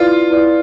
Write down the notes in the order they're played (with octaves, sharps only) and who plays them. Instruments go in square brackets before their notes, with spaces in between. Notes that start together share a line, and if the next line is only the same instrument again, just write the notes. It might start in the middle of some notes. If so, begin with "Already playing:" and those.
Already playing: [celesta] E4 B4 D5 [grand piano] F4
[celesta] E4 B4 D5